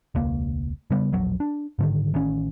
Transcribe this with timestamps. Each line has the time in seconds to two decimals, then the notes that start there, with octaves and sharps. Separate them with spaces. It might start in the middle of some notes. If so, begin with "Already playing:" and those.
0.15 E1 C#2 A#3
0.91 C#3 G3 B3
1.12 E1 A#1 F#3
1.40 D4
1.79 G#2 D3 D#3
2.14 A1 D#3 C#4